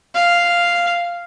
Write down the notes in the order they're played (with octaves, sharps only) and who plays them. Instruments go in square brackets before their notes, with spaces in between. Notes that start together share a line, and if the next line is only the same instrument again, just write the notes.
[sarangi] F5